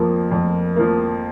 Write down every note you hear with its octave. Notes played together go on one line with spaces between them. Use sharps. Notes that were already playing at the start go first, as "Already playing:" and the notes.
Already playing: F2 F3 A#3
F2
F3 A#3